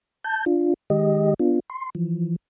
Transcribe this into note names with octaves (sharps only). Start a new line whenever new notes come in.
A5 G6
D4 F4
D#3 G#3 G4 D#5
B3 D4 F4
C6
E3 F3